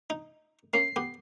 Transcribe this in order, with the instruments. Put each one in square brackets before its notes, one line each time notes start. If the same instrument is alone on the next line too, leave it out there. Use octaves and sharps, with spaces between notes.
[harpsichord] D#4
[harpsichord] A#3 C#4 [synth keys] C7
[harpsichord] B3 G4